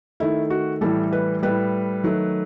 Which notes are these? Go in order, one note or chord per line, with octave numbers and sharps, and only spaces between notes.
D#3 A3 E4
F#4
A2 E3 G3 A4
B4
A2 G3 B4
D#3 F#3 A3